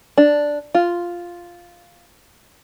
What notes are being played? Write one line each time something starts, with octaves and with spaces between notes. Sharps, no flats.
D4
F4